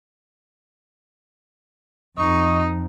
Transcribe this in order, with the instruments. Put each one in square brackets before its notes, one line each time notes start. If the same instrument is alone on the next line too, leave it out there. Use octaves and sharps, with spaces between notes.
[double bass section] F2 [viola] D#4 [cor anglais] D#5 [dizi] C#6